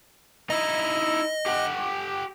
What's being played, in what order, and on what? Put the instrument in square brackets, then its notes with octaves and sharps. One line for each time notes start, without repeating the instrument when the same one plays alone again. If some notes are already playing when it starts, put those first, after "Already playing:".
[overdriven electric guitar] D#4 E4 [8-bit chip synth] D#5
[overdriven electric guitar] G4 F#5